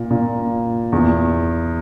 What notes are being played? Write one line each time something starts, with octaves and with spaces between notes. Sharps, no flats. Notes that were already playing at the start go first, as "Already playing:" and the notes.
Already playing: A#2
A#2
E2